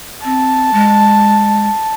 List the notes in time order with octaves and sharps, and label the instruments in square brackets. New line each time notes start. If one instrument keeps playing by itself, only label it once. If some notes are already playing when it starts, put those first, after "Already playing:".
[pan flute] C4 [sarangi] A5
[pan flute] G#3